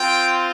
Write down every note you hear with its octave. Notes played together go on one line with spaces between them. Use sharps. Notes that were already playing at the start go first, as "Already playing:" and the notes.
Already playing: C4 F4 G5